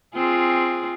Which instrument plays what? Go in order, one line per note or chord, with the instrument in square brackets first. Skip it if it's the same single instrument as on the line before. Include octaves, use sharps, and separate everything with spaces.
[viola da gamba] C4 F4 G#4